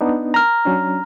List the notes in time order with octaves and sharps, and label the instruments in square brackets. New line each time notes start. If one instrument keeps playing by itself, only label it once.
[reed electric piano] B3 D4 D#4
[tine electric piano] A#5 F6
[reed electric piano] F#3 C#4 D4